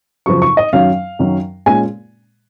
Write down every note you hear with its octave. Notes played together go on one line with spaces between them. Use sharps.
F#2 C#3 F3 C#6
C#6
D#5
F#2 D#3 F#3 C#4 F5
F#2 D#3 F#3 C#4
A#2 G#3 C#4 G#5